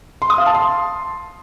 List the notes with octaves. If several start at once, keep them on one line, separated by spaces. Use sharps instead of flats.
C6
D#6
F5
A5
C6